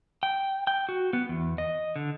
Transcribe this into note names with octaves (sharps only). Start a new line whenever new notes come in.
G5
G5
F#4
B3
E2
D#5
D3